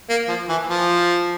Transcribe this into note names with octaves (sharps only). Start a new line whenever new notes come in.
A#3
F3
E3
F3